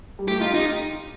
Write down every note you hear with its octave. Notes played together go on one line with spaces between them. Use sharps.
G3
A3 G4
D#4 F4
D#4 G4